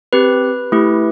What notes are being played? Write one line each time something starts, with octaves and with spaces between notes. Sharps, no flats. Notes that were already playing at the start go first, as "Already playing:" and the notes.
C4 G4 B4
A3 E4 G4